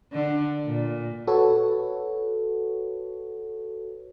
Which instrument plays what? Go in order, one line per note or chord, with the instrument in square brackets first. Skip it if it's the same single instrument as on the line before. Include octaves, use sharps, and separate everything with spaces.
[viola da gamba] D3
A#2
[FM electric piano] F#4 A4 B4 C#5